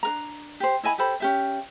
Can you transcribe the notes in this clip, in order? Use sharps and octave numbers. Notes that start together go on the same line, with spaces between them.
D4 A#4 A#5
G4 C5
E4 D#5 G#5 B5
G4 A4 C5 B5
C#4 G4 E5